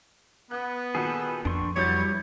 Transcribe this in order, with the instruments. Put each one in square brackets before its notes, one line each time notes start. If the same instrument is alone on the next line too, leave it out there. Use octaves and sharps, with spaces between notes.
[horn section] B3 [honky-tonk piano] D#6 F#6
[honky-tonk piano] A#2 D#3 F#4 [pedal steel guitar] G#4 A4 B4
[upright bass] F2 [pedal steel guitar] D4 C6 C#6
[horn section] F#3 C#5 [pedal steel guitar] G3 E4 B4 [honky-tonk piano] D6 G6 A6